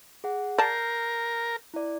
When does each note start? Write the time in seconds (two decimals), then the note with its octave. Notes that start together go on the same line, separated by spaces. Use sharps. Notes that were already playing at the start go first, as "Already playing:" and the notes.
0.24 G#4 F#5
0.58 A#4 D5 A5 G6 C7
1.74 E4 D5